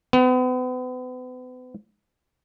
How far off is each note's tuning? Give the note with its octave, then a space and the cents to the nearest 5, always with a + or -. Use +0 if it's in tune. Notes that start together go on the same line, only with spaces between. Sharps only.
B3 +40